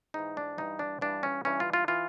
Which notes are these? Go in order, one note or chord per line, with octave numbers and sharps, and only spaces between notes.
G#2 E3 D#4
D4
G2 E3 D#4
D4
G2 E3 D4
C#4
G2 E3 C#4
F4
F4
E3 F4